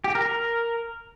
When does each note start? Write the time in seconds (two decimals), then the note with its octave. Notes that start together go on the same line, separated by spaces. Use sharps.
0.04 G4
0.15 A#4
0.26 A#4